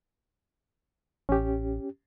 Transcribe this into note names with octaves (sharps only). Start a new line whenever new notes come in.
A1 C#4 G4